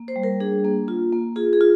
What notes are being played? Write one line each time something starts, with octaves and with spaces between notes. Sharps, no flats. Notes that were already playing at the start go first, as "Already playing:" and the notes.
Already playing: A#3
C5
G3
A#4
D4 G#4
A#3
F4
A#3
F4 G#4
G#4
F4